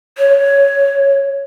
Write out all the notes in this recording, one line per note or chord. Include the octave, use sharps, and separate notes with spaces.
C#5